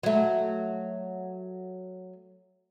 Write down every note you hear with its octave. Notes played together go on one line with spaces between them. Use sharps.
F#3 A3